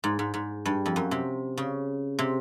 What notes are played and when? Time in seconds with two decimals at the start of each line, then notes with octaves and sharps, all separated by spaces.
0.04 G#2
0.19 G#2
0.34 G#2
0.66 G2
0.86 F2
0.96 F#2
1.11 C3
1.57 C#3
2.19 C3